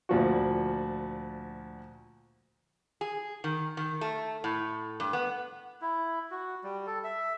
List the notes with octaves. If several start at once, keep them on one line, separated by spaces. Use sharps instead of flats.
D2 A#2 F3 F#4
G#4
D#3
D#3
A3
A2
G2
B3
E4
F#4
G3
A4
E5